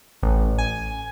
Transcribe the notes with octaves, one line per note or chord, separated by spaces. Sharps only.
A1
G#5